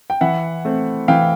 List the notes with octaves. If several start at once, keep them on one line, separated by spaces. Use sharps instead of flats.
G5
E3 E5 F#5
A3 C4
E3 F5 G5